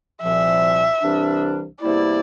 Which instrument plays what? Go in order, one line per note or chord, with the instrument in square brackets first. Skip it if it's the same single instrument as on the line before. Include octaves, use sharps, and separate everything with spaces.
[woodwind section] C2 A#2 F3 [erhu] E5
[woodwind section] C2 C3 E3 G3 D4
[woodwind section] E2 C3 G3 A#3 E4 [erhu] D5